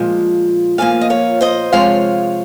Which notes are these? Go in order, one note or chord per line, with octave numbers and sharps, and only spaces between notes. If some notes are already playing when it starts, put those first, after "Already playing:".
Already playing: A#2 F3 G#3 F5
A#2 F3 A#3 F5 G#5
D#5
C#5 F5
C5 D#5
C3 F3 G#3 C#5 F5